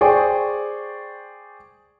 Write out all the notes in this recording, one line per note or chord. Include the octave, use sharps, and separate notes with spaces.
G#4 C5 D5 G5 C#6